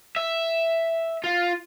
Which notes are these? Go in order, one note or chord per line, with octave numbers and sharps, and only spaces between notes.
E5
F4